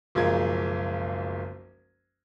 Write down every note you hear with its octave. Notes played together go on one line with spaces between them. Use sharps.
F#1 B1 F3 G#3 A#4 G#6